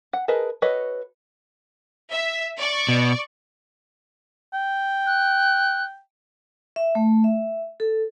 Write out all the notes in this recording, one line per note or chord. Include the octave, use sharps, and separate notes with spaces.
F#5
G#4 A#4 B4 D#5 A5
F#4 A4 B4 C#5 D#5
E5
D5 C#6
B2
G5
F#6
E5
A3
E5
A4